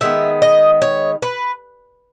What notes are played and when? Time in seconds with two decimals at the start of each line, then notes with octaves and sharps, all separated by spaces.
0.01 D#3 G#3 B3 E5
0.42 D#5
0.82 C#5
1.22 B4